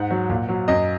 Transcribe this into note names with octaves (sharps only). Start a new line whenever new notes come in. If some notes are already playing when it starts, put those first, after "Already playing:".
Already playing: G#2 F#5
F#3
A#2
F#3
F#2 D#5